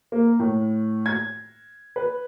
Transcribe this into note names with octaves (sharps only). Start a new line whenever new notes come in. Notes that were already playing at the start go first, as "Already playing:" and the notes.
A#3
A2
G#6
B4